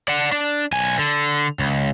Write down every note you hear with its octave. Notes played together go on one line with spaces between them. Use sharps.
D5 F#5
D4
B1 G#5
D3
C#2